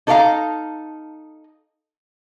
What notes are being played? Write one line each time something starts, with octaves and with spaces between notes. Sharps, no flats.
D#4 A4 C#5 D5 F5 A#5